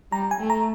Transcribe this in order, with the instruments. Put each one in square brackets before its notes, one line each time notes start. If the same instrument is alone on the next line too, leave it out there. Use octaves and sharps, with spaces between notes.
[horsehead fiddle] G3 [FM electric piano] A#5
[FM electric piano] G#5
[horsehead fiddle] A3
[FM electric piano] A#5